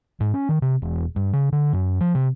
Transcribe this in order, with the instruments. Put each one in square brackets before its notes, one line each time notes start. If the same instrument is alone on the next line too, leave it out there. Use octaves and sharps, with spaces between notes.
[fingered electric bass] G#2
C#4
D#3
C3
E1
G2
C#3
D3
F#2
F3
C3